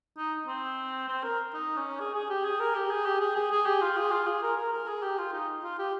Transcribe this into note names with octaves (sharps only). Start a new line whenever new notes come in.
D#4
C4
C4
A#4
D#4
C#4
G#4
G#4
G4
G#4
A#4
G4
G#4
G4
G#4
G#4
G#4
G4
F4
G#4
F4
G#4
A#4
A#4
A#4
G#4
G4
F4
D#4
F4
G4